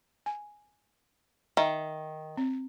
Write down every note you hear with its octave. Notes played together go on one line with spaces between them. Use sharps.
G#5
D#3 E5
C4